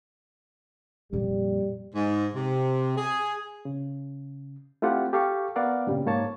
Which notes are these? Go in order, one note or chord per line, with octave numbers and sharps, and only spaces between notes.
F2 A#2 G3
G#2
C3
G#4
C#3
A3 C4 E4 F4 G4 F#5
G4 A4 F5 C#6
B3 A#4 D5 F5 F#5
G2 A#2 C#3 G3
G#2 A#3 C#5 A5